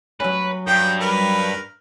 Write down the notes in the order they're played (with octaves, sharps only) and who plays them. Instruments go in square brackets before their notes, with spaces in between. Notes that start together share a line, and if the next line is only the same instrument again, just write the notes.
[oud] F#3 C#4 [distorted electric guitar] B4
[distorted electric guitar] G2 [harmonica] G5 D#6
[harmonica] A#4 B4